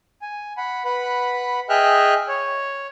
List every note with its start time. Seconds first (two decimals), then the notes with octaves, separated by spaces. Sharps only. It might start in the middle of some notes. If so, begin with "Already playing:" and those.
0.22 G#5
0.57 F#5 B5
0.85 B4 F#5 B5
1.69 G#4 D#5 E5 G5 F6 F#6
2.28 C#5